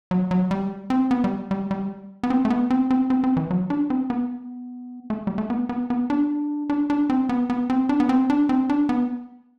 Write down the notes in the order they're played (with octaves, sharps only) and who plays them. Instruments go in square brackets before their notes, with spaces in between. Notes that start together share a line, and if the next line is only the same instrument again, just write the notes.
[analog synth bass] F#3
F#3
G3
C4
B3
G3
G3
G3
B3
C4
A3
B3
C4
C4
C4
C4
E3
F#3
D4
C4
B3
A3
G3
A3
B3
B3
B3
D4
D4
D4
C4
B3
B3
C4
D4
B3
C4
D4
C4
D4
B3